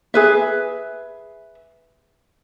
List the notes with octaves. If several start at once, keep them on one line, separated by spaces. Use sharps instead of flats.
G#4 B4 E5